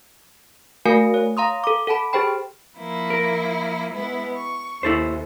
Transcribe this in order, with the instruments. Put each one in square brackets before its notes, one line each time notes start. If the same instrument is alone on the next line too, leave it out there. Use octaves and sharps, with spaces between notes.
[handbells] A3 F#4 A#4 F5 G#5 C#7
C#5
F5 A#5 C6 D#6
A4 D6
A4 F#5 A5 B5
G4 G#4 C5 G5 B5
[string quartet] F3 A#3 E4
[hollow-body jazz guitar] A#4
[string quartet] G#3 B3 E4
C#6
[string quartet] D#2 [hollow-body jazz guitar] E4 A4 C5